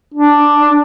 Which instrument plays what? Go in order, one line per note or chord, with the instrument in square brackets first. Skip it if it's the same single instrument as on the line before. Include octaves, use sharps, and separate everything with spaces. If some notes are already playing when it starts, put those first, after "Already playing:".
[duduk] D4